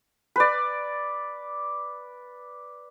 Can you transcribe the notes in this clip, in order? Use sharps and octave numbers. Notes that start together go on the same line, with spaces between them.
B4 D5